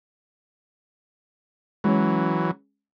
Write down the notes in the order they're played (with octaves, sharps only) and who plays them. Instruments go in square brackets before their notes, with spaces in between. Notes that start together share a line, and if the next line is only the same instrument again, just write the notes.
[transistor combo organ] E3 F#3 [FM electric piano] G#3 C#4